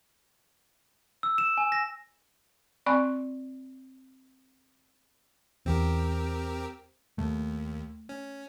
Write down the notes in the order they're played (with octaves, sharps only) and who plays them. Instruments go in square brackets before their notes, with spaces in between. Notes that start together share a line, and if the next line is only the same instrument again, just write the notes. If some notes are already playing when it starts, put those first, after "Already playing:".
[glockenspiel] E6
E7
G#5
A#6
[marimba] C4 D5 G#5 B5 C#6 F#6
[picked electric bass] E2 [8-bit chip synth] C4 G4 A#4
[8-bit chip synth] D#2 [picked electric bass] A3
[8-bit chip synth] C#4